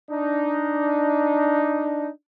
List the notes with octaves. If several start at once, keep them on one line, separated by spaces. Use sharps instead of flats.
D4 D#4